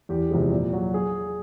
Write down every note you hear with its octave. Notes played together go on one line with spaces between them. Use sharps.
E2 G4
C3 F3 G#3
A#2
F#3
G#4